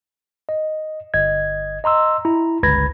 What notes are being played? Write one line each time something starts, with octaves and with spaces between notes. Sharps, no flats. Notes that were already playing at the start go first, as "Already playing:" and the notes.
D#5
G1 D#5 G#6
D#5 A#5 C6 E6
E4 A#5
G1 C#2 B4 B5 G#6 A#6